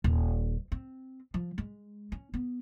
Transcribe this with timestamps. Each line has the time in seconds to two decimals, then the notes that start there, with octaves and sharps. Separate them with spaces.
0.04 D#1
0.72 C4
1.34 F3
1.58 G#3
2.12 C#4
2.34 B3